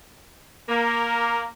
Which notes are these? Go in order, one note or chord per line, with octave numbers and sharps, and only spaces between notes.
A#3 A#4